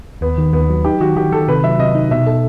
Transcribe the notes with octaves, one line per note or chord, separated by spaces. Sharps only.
D#2 B3
D#3
D#2 B3
F#3
D#4 G4
D#3 F#4
D#3 G4
D#3 A4
C3 B4
F#3 E5
C3 D#5
D#4
B2 E5
A4